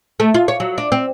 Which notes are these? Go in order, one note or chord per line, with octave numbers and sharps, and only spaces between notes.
A3
F4
C#5
F#3
D4
C4